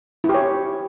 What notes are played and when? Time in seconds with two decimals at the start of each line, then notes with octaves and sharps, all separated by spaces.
0.24 E4
0.29 G4
0.34 C#5